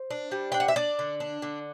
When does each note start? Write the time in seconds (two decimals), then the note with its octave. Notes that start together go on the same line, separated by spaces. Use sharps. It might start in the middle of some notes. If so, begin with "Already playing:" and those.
Already playing: C5
0.11 D4
0.32 G3
0.52 D4 G5
0.60 F#5
0.68 E5
0.76 D4 D5
0.99 D3
1.20 D4
1.42 D3